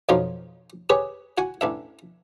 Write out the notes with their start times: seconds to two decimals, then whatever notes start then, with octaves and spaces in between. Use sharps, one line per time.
0.09 B1 F2 F3 F#3 D#4 C6
0.90 G4 G#4 B4 C#5
1.38 F#4 F#5 G#5
1.61 A1 D4 E5